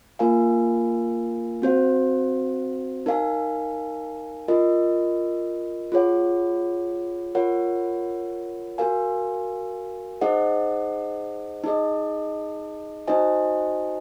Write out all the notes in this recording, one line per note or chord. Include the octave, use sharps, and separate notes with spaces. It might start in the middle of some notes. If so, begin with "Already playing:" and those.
A#3 F4 A#4 F5 G#5
C4 F#4 C5 F5
D#4 A#4 F5 G#5
F4 A#4 D#5
F4 G#4 C#5 F#5
F4 A#4 C#5 F#5
F#4 A#4 F5 G#5
D#4 G#4 C5 D#5 F#5
D#4 G#4 D#5
D#4 F#4 C5 D#5 G#5